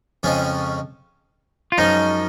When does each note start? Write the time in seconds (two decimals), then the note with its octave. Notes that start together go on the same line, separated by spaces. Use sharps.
0.23 F2 C#3 F3 G#3 C#4
1.72 F4
1.78 F#2 F3 G#3 C#4 D#4